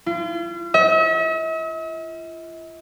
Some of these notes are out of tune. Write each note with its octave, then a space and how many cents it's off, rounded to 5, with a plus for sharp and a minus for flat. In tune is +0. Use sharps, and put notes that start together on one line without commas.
F4 -40
E5 -45